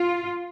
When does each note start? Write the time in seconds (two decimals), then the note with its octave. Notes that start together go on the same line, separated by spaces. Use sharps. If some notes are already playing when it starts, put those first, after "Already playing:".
Already playing: F4